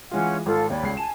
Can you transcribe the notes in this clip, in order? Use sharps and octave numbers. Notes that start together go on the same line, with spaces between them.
E3 G#3 C#4 F4 F#5
G#1 F4 A4
D#2 C#5 D5 B5
C#2 C7
G#5 A5 E7